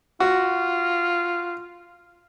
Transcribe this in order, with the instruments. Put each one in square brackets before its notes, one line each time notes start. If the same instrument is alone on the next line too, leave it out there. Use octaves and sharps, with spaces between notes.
[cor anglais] F4 [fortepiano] F#4